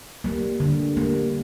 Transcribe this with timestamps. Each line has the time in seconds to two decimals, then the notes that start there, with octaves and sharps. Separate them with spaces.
0.24 G3 A#3
0.60 D3
0.97 G3 A#3